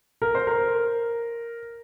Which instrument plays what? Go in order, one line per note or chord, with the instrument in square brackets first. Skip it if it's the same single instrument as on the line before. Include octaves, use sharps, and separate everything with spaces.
[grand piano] A#4
C5
A#4